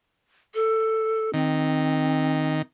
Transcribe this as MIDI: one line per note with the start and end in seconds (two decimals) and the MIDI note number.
0.54 1.30 69
1.34 2.62 51
1.34 2.59 60